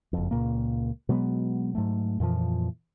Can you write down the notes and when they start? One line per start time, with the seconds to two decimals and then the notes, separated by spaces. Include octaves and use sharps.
0.13 F#1 F2
0.31 C#2 A#2 A#3
1.09 B2 F#3 G#3 B3
1.75 G#2 F#3 A3
2.20 F2 A#2 E3 F3